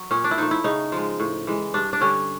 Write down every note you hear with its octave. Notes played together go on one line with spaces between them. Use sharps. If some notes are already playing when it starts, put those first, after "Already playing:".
Already playing: F#3
A#2 C#4
D4
E4
F3 A3 D#4
E4
C#3 D#4
F3 G#3
A2
E3 G#3
G2 D4
D4
D3 G3 C#4